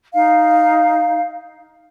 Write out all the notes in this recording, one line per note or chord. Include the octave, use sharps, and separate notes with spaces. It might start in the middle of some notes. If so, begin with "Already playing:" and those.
D#4 F5